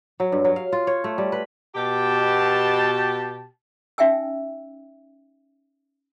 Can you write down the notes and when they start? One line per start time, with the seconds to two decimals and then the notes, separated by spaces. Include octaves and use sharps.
0.20 F#3
0.32 G2
0.45 F#3
0.56 F5
0.73 F4
0.87 C#5
1.04 A3
1.18 G3
1.32 B4
1.75 B2 G4 A5
3.98 C#4 D#4 E5 G5 G#5 E6